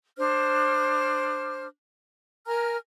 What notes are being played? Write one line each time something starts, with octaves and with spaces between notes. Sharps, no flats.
D4 C5 F6
A#4 G#5 A#5 F6